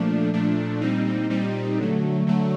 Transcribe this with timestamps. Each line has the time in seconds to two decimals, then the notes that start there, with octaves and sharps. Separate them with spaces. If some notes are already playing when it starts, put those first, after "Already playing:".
Already playing: A#2 F3 A3 D4
0.33 A#2 F3 A3 D4
0.81 A#2 G3 C4 D#4
1.30 A#2 G3 C4 D#4
1.78 D3 F#3 A3
2.27 D3 F#3 A3